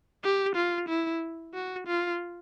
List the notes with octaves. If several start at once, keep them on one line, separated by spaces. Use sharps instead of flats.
G4
F4
E4
F#4
F4